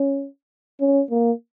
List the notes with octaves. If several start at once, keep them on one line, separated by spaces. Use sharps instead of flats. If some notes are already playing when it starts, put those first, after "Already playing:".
Already playing: C#4
C#4
A#3